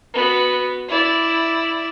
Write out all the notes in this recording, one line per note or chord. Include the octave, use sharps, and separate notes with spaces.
B3 F#4
E4 D5